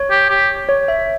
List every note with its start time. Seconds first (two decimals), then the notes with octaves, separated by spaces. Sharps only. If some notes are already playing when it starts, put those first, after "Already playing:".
Already playing: C#5
0.11 G4
0.30 G4
0.69 C#5
0.88 E5